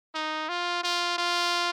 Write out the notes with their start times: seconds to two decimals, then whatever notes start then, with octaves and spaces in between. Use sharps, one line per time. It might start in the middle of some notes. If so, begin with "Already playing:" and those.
0.15 D#4
0.49 F4
0.83 F4
1.18 F4